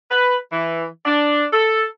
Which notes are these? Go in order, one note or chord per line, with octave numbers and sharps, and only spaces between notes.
B4
E3
D4
A4